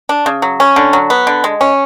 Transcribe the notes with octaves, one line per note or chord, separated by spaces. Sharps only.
D4
C#3
F#3
C#4
D3
F#3
B3
D3
G#3
C#4